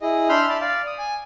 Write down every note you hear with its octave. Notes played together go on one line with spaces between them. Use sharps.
E4 G#4 D#5
D4 E5 B5 C6 F6 G6
D5 A5 B5
D5 F5
D#6
G#5